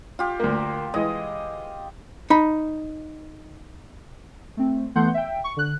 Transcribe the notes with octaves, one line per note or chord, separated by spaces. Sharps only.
F4 G4
D2 A#3
E3 G#3 D#5
D#4 B5
A3 C4
E3 A3 B3 F#5 C6 G6
E5 G5
C#6
D3 F#6